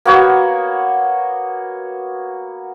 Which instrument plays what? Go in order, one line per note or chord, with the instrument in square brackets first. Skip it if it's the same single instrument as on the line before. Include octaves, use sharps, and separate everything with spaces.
[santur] A#3 B3 F#4 C#5